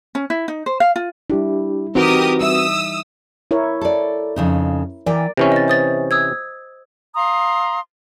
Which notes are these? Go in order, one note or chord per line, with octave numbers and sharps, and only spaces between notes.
C#4
E4
D#4
C5
F5
F4
G3 D4 E4 G4
E3 C4 D#4 F#4 G4 A#4 B4 D#6
G3 E5 D#6 E6
E4 A#4 C#5
A4 D5
F2 C#3 D#4
E3 A#4 D5 G5 G#5
C3 E3 C#4
D#5 A6
C5 D#6 A6
D#6 E6 G#6
F5 A#5 C6 D#6